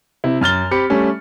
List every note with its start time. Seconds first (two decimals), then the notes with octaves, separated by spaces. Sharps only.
0.24 C3 E4
0.41 F#2 F6 A6 G7
0.71 C4 G4 B5 C#7
0.90 G3 A3 C#4